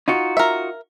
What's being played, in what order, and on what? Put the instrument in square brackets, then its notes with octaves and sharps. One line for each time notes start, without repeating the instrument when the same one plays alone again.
[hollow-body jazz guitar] D#4 F4 F#4
[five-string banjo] A#4 E5